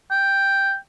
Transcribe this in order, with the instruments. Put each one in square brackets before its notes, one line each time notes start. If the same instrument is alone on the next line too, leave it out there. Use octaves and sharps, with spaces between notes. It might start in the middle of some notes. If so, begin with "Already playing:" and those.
[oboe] G5